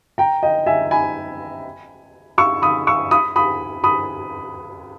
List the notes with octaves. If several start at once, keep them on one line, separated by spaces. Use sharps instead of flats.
G5 A#5
D#5 G5
E5 G#5
G#5 B5
C#6 E6
B5 D#6
C#6 E6
B5 D#6
B5 D#6
B5 D#6